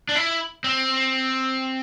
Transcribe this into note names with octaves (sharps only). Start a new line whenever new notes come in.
D4
E4
C4